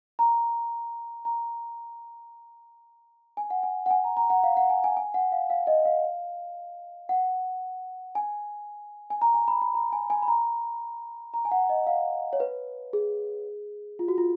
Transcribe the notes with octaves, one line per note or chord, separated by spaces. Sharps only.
A#5
A#5
G#5
F#5
G#5
F#5
G#5
A#5
A#5
F#5
F5
F#5
G#5
G#5
G#5
F#5
F5
F5
D#5
F5
F#5
G#5
G#5
A#5
G#5
B5
B5
A#5
G#5
G#5
B5
A#5
A#5
G#5
F#5
D#5
F5
C#5
B4
G#4
F4
F#4
F4